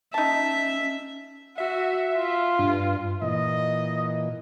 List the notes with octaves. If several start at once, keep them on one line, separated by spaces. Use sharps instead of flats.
C#4 D#4 E5 A5
F#4 E5
F4
G2
A#2 E3 D#5